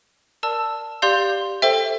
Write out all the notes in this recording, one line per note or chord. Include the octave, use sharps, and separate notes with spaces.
A#4 D5 A5 E6
G4 D5 F5 C6 G6
A4 C5 E5 G5